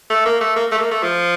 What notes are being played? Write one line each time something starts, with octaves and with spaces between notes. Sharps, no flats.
A3
A#3
A3
A#3
A3
A#3
A3
F3